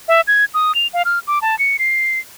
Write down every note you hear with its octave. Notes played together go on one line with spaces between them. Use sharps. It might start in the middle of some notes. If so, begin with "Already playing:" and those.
E5
G#6
D#6
F7
F5
F6
D6
A5
C#7
C7